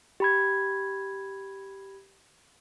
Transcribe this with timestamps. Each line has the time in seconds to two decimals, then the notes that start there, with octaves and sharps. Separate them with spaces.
0.20 G4 B5 G#6